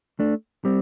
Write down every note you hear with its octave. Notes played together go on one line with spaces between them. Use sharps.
A3 D4
G3 C4